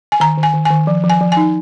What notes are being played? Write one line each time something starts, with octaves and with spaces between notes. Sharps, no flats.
G#5
D#3 A#5
D#3
G#5
D#3
D#3 G#5
F3
F3
G#5
F3
D#4 G#5